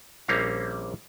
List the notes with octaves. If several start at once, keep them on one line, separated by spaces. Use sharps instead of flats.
A#1 G3 A#3 C4 C#4 F5